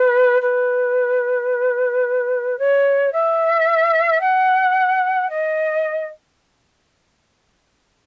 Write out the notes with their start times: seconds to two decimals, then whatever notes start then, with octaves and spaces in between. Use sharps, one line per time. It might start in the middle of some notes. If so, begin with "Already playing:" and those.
Already playing: B4
0.41 B4
2.58 C#5
3.12 E5
4.20 F#5
5.29 D#5